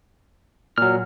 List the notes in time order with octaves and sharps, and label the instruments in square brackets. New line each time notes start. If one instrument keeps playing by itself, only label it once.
[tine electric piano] A#2 F#3 [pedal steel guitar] F6